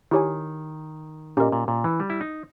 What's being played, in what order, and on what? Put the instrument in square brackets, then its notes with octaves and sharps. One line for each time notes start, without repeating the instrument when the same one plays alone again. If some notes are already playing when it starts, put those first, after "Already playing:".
[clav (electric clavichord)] D#3 [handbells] E4 G4 C#5 G#5
[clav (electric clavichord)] A#2 [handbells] C#4 G4 A#4 D#5
[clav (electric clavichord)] A#2
A#2
E3
G3
E4
D#4